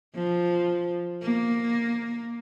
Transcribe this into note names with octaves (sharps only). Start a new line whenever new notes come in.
F3
A#3